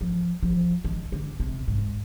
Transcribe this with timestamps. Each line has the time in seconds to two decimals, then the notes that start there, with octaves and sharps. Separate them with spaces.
0.01 F3
0.43 F3
0.84 D#3
1.12 D3
1.40 C3
1.68 G#2